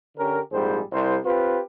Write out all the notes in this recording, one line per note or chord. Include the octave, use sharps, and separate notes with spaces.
D3 C#4 G4 A#4
A#1 G#2 G3 C4 G#4 C5
C2 C5
C4 F4 G4 B4